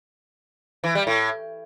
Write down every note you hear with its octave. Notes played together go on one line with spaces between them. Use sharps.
E3
G3
A2